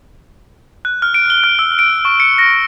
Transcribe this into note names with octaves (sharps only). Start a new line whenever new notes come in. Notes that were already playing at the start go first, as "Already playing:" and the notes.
F#6
F6
D7
G7
F6
E6
D7
C#6
C#7
A#6